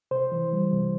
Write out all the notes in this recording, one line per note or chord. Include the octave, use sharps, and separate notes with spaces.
C3 C5
E3
G3
C3